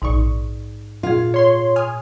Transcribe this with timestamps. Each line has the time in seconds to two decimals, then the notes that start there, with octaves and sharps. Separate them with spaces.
0.02 A#1 G#2 D#4 D5 C#6
1.03 A#2 F4 G#4
1.34 C#5 C6
1.76 G#5 D#6 F6